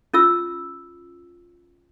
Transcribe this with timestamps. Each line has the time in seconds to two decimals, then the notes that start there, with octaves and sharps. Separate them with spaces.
0.14 C#4 F4 E6